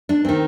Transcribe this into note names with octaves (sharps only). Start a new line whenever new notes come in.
D4
D#3 C4